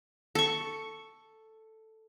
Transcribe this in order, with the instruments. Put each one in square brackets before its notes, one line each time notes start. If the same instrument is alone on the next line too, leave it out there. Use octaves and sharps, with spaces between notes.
[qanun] A4 C#6